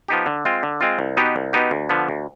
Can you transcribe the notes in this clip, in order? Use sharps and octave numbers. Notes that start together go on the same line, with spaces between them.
F3 B3 D#4 G4
D3
G#3 C4 F4
D3
G#3 C4 F4
C2
B2 B3 D#4 G4
C2
B2 B3 D#4 G4
D2
D3 F3 B3
D2